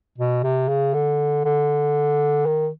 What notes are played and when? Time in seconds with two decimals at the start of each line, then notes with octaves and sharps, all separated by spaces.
0.18 B2
0.44 C3
0.69 C#3
0.94 D3
1.45 D3
2.46 D#3